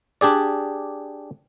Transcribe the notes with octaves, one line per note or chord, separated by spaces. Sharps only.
D4 G4 G#4 D5